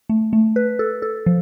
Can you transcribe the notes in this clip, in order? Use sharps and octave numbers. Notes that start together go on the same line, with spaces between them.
A3
A3
B4
A4
A4
F3